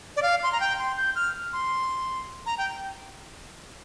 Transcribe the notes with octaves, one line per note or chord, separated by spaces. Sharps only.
D5
F5
C6
A#5
G5
C6
G6
F6
C6
A#5
G5